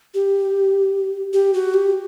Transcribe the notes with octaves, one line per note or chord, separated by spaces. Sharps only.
G4
G4
F#4
G4